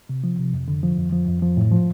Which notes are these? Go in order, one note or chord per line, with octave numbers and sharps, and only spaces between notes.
C3
F3
C3
F2
D3
F3
F2
F3
F2
F3
A2
F3